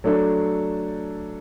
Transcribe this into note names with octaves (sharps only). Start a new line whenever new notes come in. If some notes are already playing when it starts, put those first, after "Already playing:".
F#3 A3 D4 A4